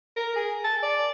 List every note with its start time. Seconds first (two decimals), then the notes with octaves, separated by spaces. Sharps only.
0.16 A#4
0.36 G#4
0.64 A5
0.83 D5